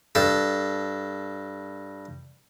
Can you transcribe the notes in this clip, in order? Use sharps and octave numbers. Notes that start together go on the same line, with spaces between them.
G2 A4